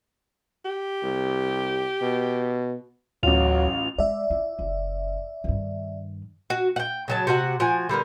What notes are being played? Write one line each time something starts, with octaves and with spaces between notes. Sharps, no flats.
G4
C2
B2
A1 D2 F#3 F4 F7
G#3 D5 E5
E4
F#1
G2 D#3
F#4
F#5 G5
C#3 F#3 A5
C3 F#4 F#5
F3 F#4 G#5
D3 G3 B3 A#4